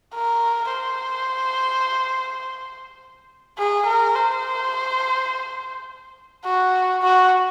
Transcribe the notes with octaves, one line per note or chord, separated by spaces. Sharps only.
A#4
C5
G#4
A#4
C5
F#4
F#4